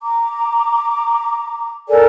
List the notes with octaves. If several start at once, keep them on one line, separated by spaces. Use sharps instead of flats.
A#5 D6
A4 A#4 D5 G#5